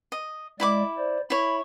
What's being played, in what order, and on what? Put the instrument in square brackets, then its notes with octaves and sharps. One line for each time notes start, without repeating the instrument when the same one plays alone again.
[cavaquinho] D#5
[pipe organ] G#3 D5 [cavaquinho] E4 B5 D6
[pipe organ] C5 D5
[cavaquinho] E4 C#5 [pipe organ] B5